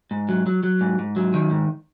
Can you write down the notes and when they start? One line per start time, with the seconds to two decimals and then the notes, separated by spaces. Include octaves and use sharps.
0.11 G#2
0.29 F#3
0.46 F#3
0.63 F#3
0.81 G#2
0.99 G#2
1.16 F#3
1.34 D#3
1.51 G#2